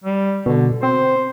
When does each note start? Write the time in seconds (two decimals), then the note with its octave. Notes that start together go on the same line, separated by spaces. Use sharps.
0.04 G3
0.46 B2 D3
0.83 C4 C5